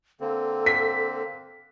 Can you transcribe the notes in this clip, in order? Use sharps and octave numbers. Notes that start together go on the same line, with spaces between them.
D3 A#3 C4 A4
B6